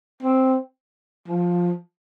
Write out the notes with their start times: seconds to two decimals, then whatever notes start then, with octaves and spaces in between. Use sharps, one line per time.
0.22 C4
1.28 F3